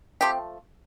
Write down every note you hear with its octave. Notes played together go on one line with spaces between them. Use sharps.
F3 A3 C4 G4